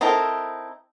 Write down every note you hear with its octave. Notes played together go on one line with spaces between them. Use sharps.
C4 D#4 E4 A4 A#4